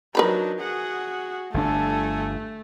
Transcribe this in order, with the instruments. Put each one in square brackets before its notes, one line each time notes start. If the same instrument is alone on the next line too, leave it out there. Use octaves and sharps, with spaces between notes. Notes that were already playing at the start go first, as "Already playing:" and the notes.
[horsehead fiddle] F#3 D4 [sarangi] D#4 [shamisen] A#4 B4 B5
[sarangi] F#4 [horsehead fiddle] G#4 F#5
[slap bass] G1 B2 D4 [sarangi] A3 [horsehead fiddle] A4 G#5